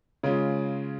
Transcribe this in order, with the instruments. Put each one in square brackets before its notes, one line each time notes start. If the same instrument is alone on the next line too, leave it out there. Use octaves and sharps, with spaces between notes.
[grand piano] C#3 G#3 C#4 F4